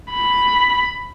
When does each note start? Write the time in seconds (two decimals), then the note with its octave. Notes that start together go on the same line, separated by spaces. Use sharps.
0.10 B5